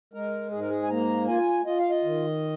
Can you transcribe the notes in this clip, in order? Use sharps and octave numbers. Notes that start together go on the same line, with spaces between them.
G#3 A#4
G#2 G#4
A#4
G#4
G#5
A#3 A#5
F4 G#5
F4 D#5
F5
D#5
D#3